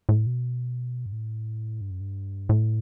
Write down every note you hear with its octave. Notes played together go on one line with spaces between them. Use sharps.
A2
B2
G2
A2
G2
F#2
G2
A2